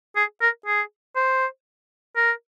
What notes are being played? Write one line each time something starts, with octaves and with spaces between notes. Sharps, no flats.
G#4
A#4
G#4
C5
A#4